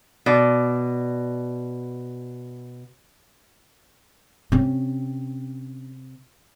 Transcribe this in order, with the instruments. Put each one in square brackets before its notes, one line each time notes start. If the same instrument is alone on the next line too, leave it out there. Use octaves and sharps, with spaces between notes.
[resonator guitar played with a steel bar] B2 D5
[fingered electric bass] C3 [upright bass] C4 C#4